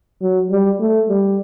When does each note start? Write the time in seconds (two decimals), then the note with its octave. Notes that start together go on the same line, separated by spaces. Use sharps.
0.22 F#3
0.50 G3
0.80 A3
1.09 G3